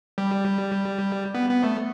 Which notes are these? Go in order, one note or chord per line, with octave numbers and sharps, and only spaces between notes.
G3
B3
B3
A3